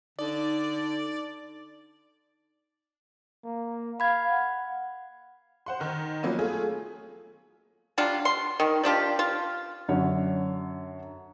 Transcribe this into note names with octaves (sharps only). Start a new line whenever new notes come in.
D3 D#4 D5 A5
A#3
F5 B5 G#6
F#5
C5 F#5 C6
D#3 D#4
F3 F#3 A#3 B3 C#4
A3 F4 G#4
F#3 G3 D4 F4
C6
D#3
G3 D4 F4 G4
F4
F#2 D3 C#5